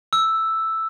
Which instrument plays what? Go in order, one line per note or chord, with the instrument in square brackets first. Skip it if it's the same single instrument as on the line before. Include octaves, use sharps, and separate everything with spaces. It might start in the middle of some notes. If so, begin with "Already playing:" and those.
[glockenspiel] E6